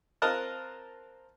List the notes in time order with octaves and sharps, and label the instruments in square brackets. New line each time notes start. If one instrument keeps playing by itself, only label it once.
[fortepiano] C4 F4 A#4 D#5 A5 F#6